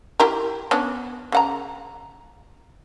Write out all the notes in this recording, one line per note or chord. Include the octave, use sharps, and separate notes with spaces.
E4 G4 A#4
B3 C#4 D4
C#3 F#5 A#5